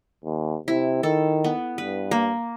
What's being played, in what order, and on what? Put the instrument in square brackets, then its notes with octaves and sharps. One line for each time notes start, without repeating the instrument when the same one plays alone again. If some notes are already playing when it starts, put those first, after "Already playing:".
[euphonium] D#2
[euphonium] C3 [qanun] E4
[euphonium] D#3 [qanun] A4
[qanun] B3
[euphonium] G2 [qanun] B4
[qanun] A#3